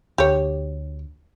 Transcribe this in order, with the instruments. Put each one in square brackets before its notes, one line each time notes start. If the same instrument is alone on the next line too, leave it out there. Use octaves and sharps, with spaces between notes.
[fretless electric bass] D2 [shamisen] G4 C#5